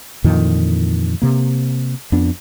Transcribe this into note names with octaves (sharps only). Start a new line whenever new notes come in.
F2 A#2 D#3 E3
C3 A#3
F2 B3 D4